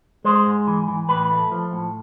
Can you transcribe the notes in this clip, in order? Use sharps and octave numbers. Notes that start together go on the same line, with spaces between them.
G#3 C5
G#2
E3
E3
A2 B4
A3
F3
A2